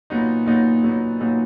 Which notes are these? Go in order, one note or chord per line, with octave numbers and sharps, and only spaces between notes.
A#2 F#3 B3 D#4
A#2 F#3 B3 D#4
A#2 F#3 B3 D#4
A#2 F#3 B3 D#4